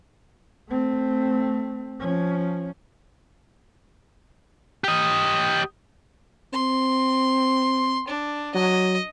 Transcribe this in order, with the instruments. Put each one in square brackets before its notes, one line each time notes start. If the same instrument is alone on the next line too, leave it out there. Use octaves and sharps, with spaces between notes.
[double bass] A3 C4
F3 C#4
[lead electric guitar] G4 D#5
[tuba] C4 [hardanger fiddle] C6
[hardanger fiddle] D4
[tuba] F#3 [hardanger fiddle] D#5